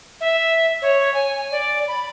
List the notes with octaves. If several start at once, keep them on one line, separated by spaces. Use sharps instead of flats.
E5
C#5
G#5
D5
B5